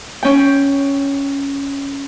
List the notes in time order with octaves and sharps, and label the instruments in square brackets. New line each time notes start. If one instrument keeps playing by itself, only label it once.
[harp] C#4 G5